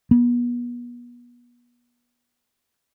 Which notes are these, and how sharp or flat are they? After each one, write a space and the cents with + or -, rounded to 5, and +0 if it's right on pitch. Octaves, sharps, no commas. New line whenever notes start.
B3 -35